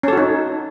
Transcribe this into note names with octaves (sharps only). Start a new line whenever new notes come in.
C#4 D#4 F#4 A4